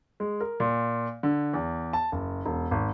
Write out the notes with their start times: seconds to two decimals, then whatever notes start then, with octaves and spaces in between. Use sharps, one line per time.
0.20 G#3
0.41 A#4
0.60 A#2
1.23 D3
1.54 E2
1.93 A5
2.12 F#1
2.46 E1
2.71 G#1